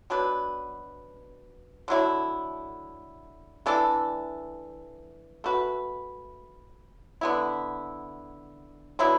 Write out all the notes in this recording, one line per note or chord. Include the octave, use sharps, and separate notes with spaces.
B2 F#3 D4 B4
D3 F#3 A3 E4
E3 A3 D4 A4
A3 F#4 B4
D3 B3 E4
D3 F#3 B3 E4